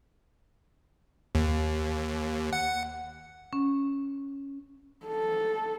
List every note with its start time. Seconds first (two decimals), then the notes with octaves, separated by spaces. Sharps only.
1.35 D#2
2.53 F#5
3.53 C#4
5.06 A4